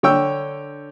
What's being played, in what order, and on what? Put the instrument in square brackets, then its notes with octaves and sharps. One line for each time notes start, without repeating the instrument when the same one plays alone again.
[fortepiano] D3 C#5 G5 E6